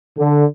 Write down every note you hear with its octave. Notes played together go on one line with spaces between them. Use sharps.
D3